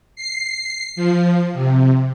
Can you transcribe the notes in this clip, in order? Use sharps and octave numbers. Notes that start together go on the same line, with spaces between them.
C7
F3
C3